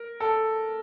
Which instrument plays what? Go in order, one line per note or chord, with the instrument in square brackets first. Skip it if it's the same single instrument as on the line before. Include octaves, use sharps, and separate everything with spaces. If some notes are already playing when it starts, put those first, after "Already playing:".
Already playing: [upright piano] A#4
A4